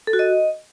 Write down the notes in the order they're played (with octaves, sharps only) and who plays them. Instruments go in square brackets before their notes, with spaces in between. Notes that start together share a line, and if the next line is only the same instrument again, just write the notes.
[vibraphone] A4
F#4
D#5